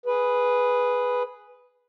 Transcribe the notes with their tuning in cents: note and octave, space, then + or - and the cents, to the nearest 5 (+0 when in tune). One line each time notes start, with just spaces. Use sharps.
G#4 +0 B4 +0